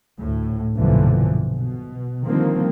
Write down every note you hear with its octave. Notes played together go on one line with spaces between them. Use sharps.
D2 A2
B1 G2 A#2 D3 E3 F3
B2
D3 D#3 F3 G3 A#3 C4